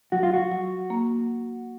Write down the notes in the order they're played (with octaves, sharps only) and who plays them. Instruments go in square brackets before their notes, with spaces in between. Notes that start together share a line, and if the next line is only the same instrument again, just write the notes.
[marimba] F#3 [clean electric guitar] F#4
[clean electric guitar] F4
F#4
[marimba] F#3
A#3